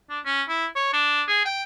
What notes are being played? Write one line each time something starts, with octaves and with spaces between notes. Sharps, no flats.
D4
C#4
E4
C#5
D4
G#4
G5